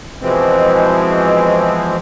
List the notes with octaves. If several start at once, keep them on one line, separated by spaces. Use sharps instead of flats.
B2 E3 F3 G#3 C4